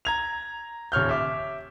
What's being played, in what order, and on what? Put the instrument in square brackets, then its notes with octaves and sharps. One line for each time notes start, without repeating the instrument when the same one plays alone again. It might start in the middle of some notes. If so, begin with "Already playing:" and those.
[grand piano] A#5 G#6 F7
D#1 C#5 F6 G6
E5 D6